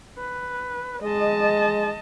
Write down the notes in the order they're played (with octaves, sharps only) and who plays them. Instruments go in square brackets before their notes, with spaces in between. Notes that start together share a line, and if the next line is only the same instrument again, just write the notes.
[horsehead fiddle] B4
[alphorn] G#3 [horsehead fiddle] D#5 A5